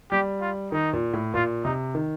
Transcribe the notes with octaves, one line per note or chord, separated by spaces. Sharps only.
G3 G4
F4
D#3 D#4
A#2
A2
A#2 F4
C3 D#4
D#3